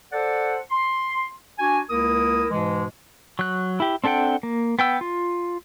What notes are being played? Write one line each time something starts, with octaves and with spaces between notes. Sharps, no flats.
A4 C5 D5 F#5
C6
D4 F#4 G#5
C#2 A#3 E4 A#4 D#6
G#2 B2 E3 G#3
F#3 F#6
E4 G4
C4 D4 A4 F#5 G5
A#3
B3 G5 E6
F4